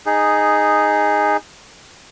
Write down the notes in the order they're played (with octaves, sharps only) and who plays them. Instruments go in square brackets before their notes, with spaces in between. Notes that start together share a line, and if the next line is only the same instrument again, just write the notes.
[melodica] D#4 G#4